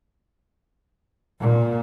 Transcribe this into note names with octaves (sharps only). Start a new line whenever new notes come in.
A#2